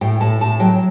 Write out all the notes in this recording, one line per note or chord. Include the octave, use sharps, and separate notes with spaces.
A2 G5
A2 A5
A2 A5
F#3 G5